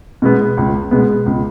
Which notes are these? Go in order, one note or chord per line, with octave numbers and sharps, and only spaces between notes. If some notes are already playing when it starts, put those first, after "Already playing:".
B2 G#3 B3
C#2
B2 G#3 B3
C#2